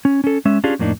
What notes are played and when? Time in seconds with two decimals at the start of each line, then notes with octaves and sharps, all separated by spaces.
0.05 C#4
0.24 C#4 A4
0.45 G#3 C#4 E5
0.64 C#4 D4 F4 G4 G#4
0.79 F2 A2 A#3 D4 D#4